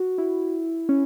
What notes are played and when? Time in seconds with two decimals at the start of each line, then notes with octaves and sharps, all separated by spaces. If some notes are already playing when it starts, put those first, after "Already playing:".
Already playing: F#4
0.18 E4
0.89 C#4